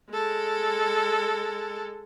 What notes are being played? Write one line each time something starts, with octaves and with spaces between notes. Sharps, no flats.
G#3 A4